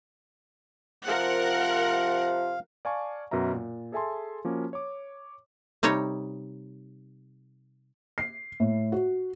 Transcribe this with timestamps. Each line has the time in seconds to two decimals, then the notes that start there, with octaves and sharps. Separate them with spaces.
1.08 C3 F3 A#4 F5 F#5
2.85 D5 F5 G#5 A5 C#6
3.31 F#2 B2 A#4 E5 A#5
3.54 A#2
3.92 G#4 A4 E5 G#5 A5 C6
4.45 F3 A#3 C#4 F#4
4.73 C#5 D6
5.83 C3 G3 D#4 C#5
8.18 C7
8.60 A2
8.92 F#4